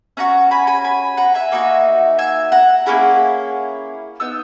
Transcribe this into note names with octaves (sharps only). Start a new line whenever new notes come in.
C#4 F#4 F#5 A#5
G#5 B5
G#5 B5
G#5 B5
F#5 A#5
E5 G#5
A#3 D#4 F#4
E5 G#5
F#5 A#5
A#3 C#4 E4 G#4
B3 D#4 E6